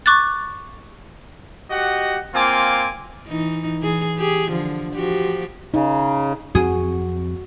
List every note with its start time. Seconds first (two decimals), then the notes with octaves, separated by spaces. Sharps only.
0.06 C#6 D6 F#6 A6
1.71 F#4 G4 D#5 F#5
2.35 A#3 C4 F4 G#5 D6
3.27 E3 D#4
3.81 E3 G#4
4.18 G4 G#4
4.51 D3 F3
4.94 F3 F#4 G4
5.74 C#3 D#4
6.55 F2 C4 F#4 G#4